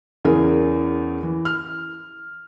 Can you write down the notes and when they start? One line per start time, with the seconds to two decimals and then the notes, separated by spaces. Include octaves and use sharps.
0.25 E2 C#3 G#4 A#4
1.23 E3
1.45 F6